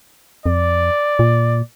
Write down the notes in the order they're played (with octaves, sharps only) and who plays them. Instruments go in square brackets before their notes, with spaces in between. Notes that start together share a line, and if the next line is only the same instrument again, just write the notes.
[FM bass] F2 [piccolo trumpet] D5
[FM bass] A#2